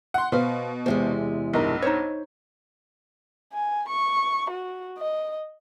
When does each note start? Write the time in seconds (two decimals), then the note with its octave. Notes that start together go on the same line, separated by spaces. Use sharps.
0.14 F#5 C6
0.32 B2 B4 C5 F5
0.86 E2 C3 G#3 C5
1.54 B1 G2 D#4 A#4 D#5
1.82 D#4 C5 C#5
3.53 G#5
3.88 C#6
4.50 F#4
4.98 D#5